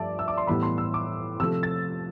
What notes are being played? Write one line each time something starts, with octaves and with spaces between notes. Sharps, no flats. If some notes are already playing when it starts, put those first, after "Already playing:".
Already playing: G2 F3 A3 D5 E5 A5
E6
D6
C6
A2 E3 G3 B3 B5
C6
E6
D6
C3 F3 A3 E6
A6